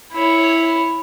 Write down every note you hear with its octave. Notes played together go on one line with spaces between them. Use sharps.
E4 C#5